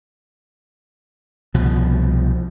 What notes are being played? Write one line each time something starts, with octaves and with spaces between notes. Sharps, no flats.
C2 B2 F3